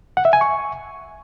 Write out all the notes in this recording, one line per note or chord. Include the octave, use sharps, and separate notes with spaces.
F#5
E5
G#5
C#6